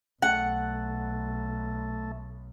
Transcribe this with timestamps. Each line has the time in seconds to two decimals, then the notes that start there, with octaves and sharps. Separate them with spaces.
0.22 B1 A3 F#5